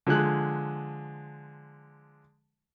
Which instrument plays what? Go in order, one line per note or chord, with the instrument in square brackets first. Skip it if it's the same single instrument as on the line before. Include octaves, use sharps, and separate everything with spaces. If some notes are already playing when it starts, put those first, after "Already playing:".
[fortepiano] D3 F3 G#3 F#6